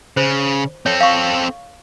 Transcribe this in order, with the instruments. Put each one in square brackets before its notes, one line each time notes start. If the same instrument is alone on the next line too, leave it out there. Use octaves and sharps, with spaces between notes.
[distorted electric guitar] C#3 [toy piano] C5
[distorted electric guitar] C4 A4 [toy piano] C#5
[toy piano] F5 C#6